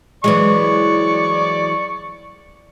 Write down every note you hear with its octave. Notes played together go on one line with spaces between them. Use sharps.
E3 F#3 G#3 D5 C#6